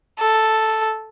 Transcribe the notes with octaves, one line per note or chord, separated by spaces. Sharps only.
A4